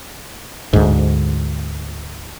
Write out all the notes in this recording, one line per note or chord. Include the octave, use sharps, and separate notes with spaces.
D2 G#2